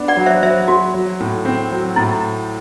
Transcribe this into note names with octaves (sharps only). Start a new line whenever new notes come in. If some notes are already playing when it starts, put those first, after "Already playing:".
Already playing: B3 D4
D5 F#5
F#3
C5 E5
F#3 C5 E5
F#3 F#4
F#3
A2
C4
F#3
A2 E4